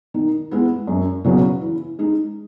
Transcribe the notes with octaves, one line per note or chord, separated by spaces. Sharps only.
D#3
G#3 B3 E4
F#2
C#3 F#3 B3
E3
G#3 D#4